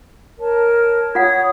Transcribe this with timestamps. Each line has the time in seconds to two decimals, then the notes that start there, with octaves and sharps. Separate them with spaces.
0.39 A#4 C#5 A5
1.15 F4 C#5 F#5 D#6 G#6